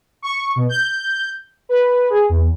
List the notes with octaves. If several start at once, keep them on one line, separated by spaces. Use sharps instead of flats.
C#6
B2
G6
B4
G#4
E2